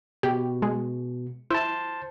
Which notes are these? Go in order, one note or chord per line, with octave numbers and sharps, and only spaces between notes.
B2 G4
G#3
E4 C5 A5